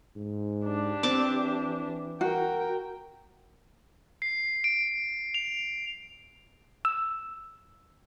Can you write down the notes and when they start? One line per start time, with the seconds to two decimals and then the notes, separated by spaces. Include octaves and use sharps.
0.16 G#2
0.65 D4 G4
1.03 E3 C4 A5 D6
2.21 F#4 A#4 G5
4.22 C7
4.64 D7
5.34 F7
6.85 E6